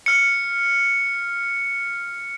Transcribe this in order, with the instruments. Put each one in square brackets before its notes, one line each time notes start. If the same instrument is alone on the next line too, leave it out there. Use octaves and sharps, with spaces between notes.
[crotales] F6 C#7